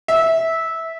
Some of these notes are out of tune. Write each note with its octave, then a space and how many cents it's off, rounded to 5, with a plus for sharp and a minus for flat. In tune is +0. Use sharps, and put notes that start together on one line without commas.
E5 -15